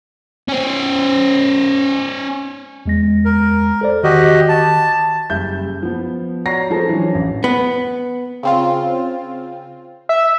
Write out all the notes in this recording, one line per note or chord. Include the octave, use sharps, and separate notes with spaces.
C#4 C5
E2 G#3 A#6
A#4
A4 C5 D5
D#3 F#4 G4 D#5
A5
F#1 G3 E5 G6
F3 B3
F#4 C#5 D5 A#5 A#6 C7
F3 C4 G#4 A4 B4 C5
E3 F#3 C#4 D4
A1
B3
C#3 C4 F4
E5